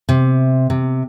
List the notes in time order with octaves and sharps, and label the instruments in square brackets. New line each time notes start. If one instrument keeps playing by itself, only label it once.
[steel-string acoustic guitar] C3
C3